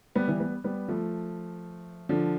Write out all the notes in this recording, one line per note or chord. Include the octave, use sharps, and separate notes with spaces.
G3 B3
E3 G3
G3 B3
G3 B3
F3 A3
D3 F3